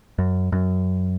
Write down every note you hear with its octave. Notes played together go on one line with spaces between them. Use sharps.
F#2
F#2